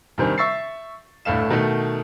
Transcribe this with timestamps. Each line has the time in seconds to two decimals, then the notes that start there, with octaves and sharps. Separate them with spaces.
0.18 G2 C3 D#3 C5 G#5
0.38 E5 C#6 E6 A6 C7
1.25 G1 A2 A3 F5 E7
1.50 B2 D#3 A3